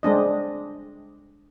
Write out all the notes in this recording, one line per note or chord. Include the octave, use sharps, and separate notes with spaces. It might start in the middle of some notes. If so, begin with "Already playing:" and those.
G#3 C4 D4 D#5